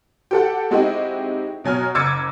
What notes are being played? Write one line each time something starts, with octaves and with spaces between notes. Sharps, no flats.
G4 A4 F#5
G#3 C4 D#4 E4 F#4 G4
B2 F#3 G#5 F6
F#1 D6 E6 G#6 A6 C#7